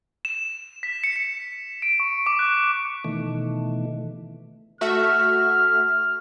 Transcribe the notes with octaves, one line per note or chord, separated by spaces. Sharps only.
E7
B6
C#7
C#7
D7
C#6
D6
F#6
B2 D#3 E3 A3
A3 F#4 E5 F6